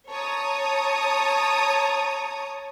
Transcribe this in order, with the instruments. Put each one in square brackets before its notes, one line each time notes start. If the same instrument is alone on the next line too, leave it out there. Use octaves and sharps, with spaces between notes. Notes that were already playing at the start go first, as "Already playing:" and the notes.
[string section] C#5 A#5 D#6 [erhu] A5